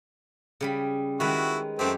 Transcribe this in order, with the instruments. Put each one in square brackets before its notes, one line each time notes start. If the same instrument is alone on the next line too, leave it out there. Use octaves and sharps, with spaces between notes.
[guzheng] C#3 G3 B5
[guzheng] D#3 G#3 B4 [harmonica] E4 F#4
[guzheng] F#2 G4 [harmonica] A3 C4